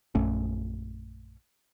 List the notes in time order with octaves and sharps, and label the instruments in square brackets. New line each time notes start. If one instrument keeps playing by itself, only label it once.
[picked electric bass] A#1 F#2 A3 C#4